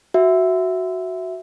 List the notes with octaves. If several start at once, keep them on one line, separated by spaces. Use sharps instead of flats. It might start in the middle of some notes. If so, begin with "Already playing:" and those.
F#4 E5